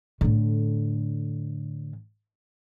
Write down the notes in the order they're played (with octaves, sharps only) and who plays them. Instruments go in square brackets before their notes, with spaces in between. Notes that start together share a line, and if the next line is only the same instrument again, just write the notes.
[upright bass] A2 D3